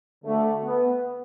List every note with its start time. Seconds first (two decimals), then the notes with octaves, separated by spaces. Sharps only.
0.25 D2 D3 A3
0.64 B3